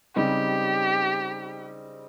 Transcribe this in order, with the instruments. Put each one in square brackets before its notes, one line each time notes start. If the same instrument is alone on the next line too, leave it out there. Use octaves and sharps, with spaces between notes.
[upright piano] C#3 G3 C4 D#4 [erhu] G4